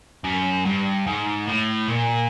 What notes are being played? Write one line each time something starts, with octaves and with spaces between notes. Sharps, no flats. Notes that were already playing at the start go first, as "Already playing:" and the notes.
F#2
G2
G#2
A2
A#2